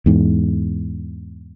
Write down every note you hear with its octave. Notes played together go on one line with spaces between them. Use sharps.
E2 G#2